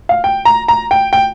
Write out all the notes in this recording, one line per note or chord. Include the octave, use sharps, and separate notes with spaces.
F5
G5
A#5
A#5
G5
G5